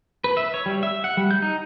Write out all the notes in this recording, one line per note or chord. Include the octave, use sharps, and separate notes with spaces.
B4
E5
C#5
G3
E5
F#5
G3
G6
D#4